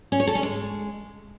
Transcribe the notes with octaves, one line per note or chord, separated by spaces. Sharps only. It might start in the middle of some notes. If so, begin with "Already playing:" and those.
C#4
C#5
A4
C#4
G#3